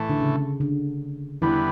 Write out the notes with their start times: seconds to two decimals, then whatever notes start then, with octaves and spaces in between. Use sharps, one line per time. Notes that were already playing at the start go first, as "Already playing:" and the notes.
Already playing: A2 E3 A3
0.10 D3
0.20 C#3
0.60 D3
1.42 E2 D3 E3 G3 B3